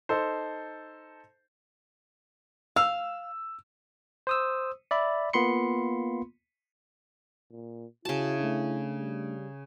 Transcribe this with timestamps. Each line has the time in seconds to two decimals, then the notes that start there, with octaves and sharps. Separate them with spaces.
0.09 D#4 A4 C5
2.76 F5 E6
4.27 C5 D#6 E6
4.91 D5 E5 B5
5.33 A#3 B3 F4 B5 C6 C#7
7.51 A#2
8.05 C#3 E4 F#4 A5
8.40 A3 D4
8.98 G3